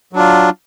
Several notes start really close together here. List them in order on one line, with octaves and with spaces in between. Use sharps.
F#3 D4 F4